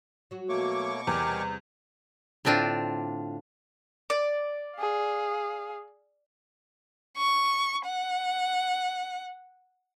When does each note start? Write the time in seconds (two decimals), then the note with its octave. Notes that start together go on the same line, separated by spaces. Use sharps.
0.31 F#3 F#4
0.49 B2 A3 A#3 C#5 C#6 D6
1.07 E2 C3 G3 G4 A#4 G#5
2.45 A2 D3 C4 D4 F4
4.10 D5
4.77 G#4 F5
7.17 C#6
7.86 F#5